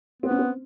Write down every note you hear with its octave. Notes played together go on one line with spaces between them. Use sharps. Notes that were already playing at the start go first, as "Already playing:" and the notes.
B3 C4
C#4
C4